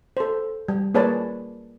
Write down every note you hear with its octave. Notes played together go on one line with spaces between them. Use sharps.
A4 C5
G3
A#3 G#4 B4 C#5 D5 A5